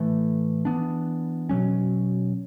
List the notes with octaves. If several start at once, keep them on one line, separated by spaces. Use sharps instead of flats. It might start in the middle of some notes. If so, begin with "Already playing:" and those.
Already playing: A2 E3 A3
E3 B3 D4
B2 F#3 C#4